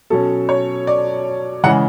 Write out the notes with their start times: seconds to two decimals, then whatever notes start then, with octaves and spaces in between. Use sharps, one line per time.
0.10 B2 F#3 C#4 A4
0.49 C#5
0.87 D5
1.64 C#3 E3 G#3 F#5